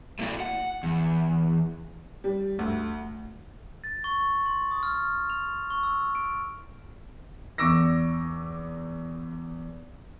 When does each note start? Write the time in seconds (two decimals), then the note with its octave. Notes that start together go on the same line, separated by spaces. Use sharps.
0.19 A3 A#3 E4 F#4 D5
0.40 F#5
0.83 E2
2.24 G3
2.59 D2
3.84 A6
4.04 C#6
4.46 C6
4.71 D#6
4.83 F6
5.30 F7
5.70 C#6
5.83 E6
6.15 D7
7.58 E2 C#6 D6 E6 A#6